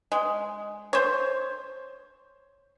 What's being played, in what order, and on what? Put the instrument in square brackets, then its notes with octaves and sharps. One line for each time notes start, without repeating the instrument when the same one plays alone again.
[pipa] G#3
C5 C#5